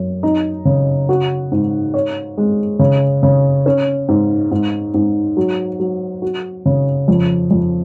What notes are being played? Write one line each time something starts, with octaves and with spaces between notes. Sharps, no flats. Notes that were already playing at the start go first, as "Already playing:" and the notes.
Already playing: F#2
D#4
C#3
F#4
G#2
C#5
G#3
C#3
C#3
C#4
G#2
G#2
G#2
F#3
F#3
F#4
C#3
F2
F2